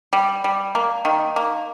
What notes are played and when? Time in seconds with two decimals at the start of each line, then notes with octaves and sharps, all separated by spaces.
0.13 G3
0.44 G3
0.75 A#3
1.05 D#3
1.36 A#3